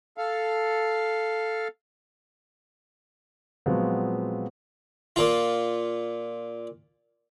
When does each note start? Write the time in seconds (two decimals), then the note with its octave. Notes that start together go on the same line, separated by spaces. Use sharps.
0.18 A4 F5
3.66 A#2 F3 F#3 G#3 B3 C4
5.16 A#2 F4